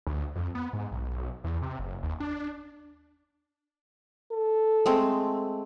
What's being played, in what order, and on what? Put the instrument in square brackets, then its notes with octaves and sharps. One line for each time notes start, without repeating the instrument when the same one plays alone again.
[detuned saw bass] D2
F2
B3
G#2
B1
E2
C3
F#1
D#2
D4
[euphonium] A4
[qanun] G#3 A3 C4